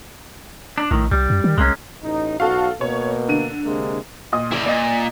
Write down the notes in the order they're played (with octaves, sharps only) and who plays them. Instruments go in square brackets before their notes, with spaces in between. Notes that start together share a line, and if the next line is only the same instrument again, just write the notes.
[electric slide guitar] D4
[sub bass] A#1 [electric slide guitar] A2 D#3
[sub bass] C2 [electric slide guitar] G3
[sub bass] F#2
D#3
[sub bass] C2 [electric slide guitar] G#3 A#3 C#4
[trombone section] A1 D#4
[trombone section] B1 F#4 [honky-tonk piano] A4 F5
[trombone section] B2 A#3 [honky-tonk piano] C#5
[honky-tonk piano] D3 D#7
[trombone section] C3 G#3 A#3
[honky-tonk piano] A#2 D#5 D#6
[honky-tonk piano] F#1 [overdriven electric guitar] E4 D5
[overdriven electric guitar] A#2 [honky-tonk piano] D5 D#5